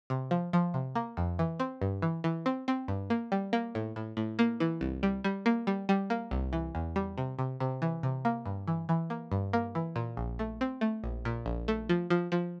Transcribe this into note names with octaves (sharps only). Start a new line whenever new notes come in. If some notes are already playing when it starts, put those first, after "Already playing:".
C3
F3
F3
C3
A#3
F2
E3
C4
G2
E3
E3
C4
C4
G2
A#3
G3
A#3
A2
A2
A2
A#3
E3
C2
G3
G3
A#3
G3
G3
A#3
C2
E3
E2
G3
C3
C3
C3
E3
C3
A#3
G2
E3
E3
A#3
G2
A#3
E3
A#2
A#1
A3
C4
A3
A#1
A#2
A#1
A3
F3
F3
F3